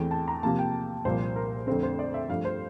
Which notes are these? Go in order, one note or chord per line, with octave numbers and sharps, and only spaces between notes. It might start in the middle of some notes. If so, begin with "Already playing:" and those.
Already playing: E2 E3 A3 C4 G5
A5
A#5
C3 F3 A#3 A5
G5
C2 A#2 F3 A#3 C5
A#4
F2 D3 A3 C4 C5
C5
D5
E5
G2 F3 A3 F5
C5